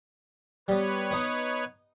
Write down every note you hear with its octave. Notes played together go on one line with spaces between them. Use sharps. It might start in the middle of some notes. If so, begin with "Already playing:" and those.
G3 B3 B4 C#5
B3 D#4